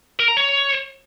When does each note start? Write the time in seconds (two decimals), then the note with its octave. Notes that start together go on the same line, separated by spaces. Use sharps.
0.20 A#4
0.28 A#5
0.37 C#5